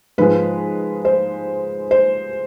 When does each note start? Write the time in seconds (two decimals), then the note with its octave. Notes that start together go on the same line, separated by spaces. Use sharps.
0.18 G#2 F3 G#3 B4
1.05 C5
1.91 C5